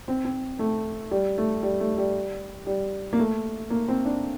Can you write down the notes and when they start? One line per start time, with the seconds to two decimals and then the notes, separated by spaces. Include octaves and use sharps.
0.08 C4
0.25 C4
0.59 A3
1.11 G3
1.38 A3
1.63 G3
1.80 A3
1.98 G3
2.66 G3
3.13 A#3
3.19 A3
3.70 A#3
3.88 C4
4.05 D4